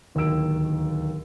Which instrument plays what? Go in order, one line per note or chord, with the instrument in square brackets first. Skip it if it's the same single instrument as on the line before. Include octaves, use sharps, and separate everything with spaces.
[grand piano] D1 D#2 D#3 A#4 E6 D7